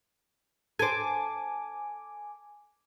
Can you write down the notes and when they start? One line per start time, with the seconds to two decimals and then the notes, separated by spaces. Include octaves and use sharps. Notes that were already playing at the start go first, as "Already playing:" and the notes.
0.79 A4 C5 G#5 D6